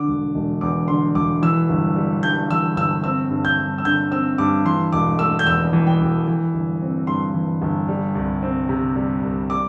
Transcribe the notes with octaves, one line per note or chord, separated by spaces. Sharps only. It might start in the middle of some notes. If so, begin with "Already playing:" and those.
Already playing: D3 D6
E1
E1
E2 D6
D3 C6
E1 D6
E3 E6
G1
G3
G2 G6
E3 E6
G1 E6
C4 E6
G2
G6
G2
E6
D3 G6
C4 E6
G2 D6
E3 C6
E1 D6
A3 E6
G6
E2 E6
E3
G5
E1
E3
G1
C4
G2 C6
E3
G1
G3
C2
C4
C3
G3
C2
G3 D6